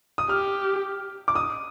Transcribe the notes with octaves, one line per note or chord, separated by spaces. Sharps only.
D#6
G4 F6
D6
D#6